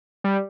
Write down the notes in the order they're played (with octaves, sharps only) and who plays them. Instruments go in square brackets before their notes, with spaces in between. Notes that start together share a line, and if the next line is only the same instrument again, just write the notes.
[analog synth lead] G3